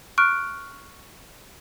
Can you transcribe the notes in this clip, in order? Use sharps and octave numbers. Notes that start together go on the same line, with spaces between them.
C#6 F6 F#6 D7